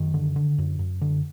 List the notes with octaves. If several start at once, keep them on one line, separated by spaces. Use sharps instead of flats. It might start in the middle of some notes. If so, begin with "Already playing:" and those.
Already playing: F#2 D#3
D3
D3
F#2
F#2
D3